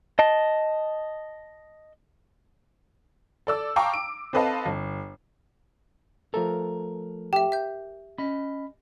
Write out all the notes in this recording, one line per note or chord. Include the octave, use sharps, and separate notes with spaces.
D#5 A5
A4 D5 E6
F5 G5 A5 A#5 C#6 D6
D7
C4 A4 B4 D#5 F5 A5
G1
F3 A3 A4 A#4 A#5
G4 E5 G5
E5 G6
C#4 D#5 B5